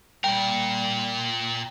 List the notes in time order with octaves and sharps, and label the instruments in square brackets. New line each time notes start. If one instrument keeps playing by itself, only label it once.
[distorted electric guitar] A#2 A#4 [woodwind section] G3 [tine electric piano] G5